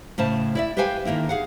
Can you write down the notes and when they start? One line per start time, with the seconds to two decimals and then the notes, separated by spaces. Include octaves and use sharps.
0.18 A2 C#3 C5 A5
0.55 E4 D5 E5
0.77 G4 B4 C5 F5 G5 G#5
1.05 D3 D#3 F#3 A#3 E4
1.29 G#4 F5 F#5